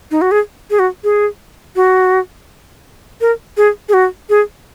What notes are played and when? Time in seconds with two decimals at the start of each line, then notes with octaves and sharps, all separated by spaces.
0.11 D#4
0.21 F#4
0.31 G#4
0.70 G#4
0.79 F#4
1.04 G#4
1.76 F#4
3.21 A#4
3.57 G#4
3.89 G#4
3.94 F#4
4.30 G#4